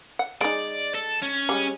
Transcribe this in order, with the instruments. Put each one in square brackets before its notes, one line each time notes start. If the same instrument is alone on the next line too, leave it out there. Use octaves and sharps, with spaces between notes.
[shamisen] F#5
[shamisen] G#3 D#4 [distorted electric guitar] D5
[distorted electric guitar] A4
C#4
[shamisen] G3 G#3